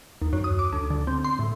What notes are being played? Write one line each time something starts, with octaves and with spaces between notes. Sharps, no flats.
D#2
F#2
D#6
D6
D2
D3
C4
C6
A2